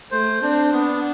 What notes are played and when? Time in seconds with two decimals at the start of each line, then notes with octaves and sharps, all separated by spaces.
0.11 A3 C5
0.42 C4 D4
0.72 B3 D4